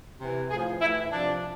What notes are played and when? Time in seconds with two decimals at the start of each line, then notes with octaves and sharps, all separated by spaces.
0.20 C3 E3
0.51 A2 F3 G#4
0.81 A2 E4
0.86 E3
1.12 C3 F3 D4